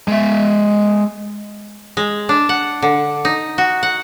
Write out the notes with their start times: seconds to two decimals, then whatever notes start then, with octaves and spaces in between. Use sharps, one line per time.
0.08 G#3 E5
1.97 G#3
2.29 D4
2.49 F#5
2.82 D3
3.25 D#4
3.58 F#4
3.83 F#5